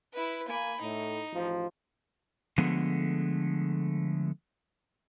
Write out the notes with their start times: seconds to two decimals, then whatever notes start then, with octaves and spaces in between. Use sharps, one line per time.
0.13 E4 B4
0.48 A#3 G#5 B5
0.81 A2 D#4
1.32 A1 F3
2.58 D3 F3 G#3 A3 B3